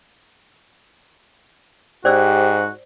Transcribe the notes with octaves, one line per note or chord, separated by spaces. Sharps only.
G#2 F#4 G4 C5 D5 E6